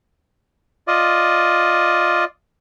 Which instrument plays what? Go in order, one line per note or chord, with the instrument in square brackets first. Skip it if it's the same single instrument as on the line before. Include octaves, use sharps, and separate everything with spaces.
[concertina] F4 D5 D#5